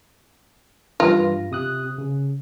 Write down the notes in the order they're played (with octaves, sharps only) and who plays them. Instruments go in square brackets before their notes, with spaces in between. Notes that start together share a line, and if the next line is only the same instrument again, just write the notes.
[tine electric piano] G2 E3 A#6 [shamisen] F4
[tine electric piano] C3 D#6 F#6
C#3